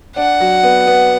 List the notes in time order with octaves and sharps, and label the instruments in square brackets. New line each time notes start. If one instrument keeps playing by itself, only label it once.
[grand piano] D4 [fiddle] F#5
[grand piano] F#3
B3
B3